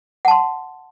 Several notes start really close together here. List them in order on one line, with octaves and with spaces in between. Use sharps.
F#5 A5 C6